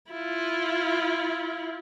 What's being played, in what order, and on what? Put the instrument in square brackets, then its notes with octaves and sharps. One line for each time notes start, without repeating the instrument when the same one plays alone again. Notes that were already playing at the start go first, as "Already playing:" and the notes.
[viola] E4 F4